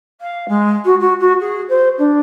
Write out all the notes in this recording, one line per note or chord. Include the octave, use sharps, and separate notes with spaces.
F5
G#3
F#4
F#4
F#4
G#4
C5
D4